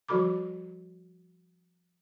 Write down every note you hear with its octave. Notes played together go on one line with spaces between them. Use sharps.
F3 G3 F#4 A4 B5 D6